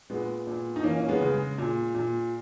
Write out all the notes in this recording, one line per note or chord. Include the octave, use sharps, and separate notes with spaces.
A#2 G#3 B3
A#2
D#4
E3 A#3 C#4
C#4
G#3 B3
C#3
G#3
A#2
A#2